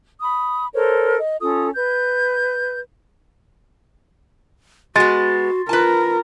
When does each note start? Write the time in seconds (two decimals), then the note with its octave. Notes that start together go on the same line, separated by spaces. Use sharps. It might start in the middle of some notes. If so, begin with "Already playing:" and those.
0.22 B5 D#6
0.74 A4 A#4 C5 C#5
1.19 D#5
1.40 C#4 F4 A4 D#6
1.74 B4 G6
4.96 G#3 B3 F#4 C6 A6
5.69 F4 A#4 B4 A5